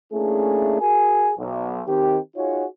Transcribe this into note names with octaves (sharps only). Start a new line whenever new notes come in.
A3 A#3 C#4 D4 E4 G#4
F#4 G#4 A#4 G#5
B1
D#3 C4 G4
D#4 F4 F#4 G#4 C#5